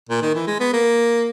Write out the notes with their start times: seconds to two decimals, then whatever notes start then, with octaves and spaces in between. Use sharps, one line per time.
0.09 A#2
0.22 D#3
0.35 E3
0.47 G#3
0.60 B3
0.73 A#3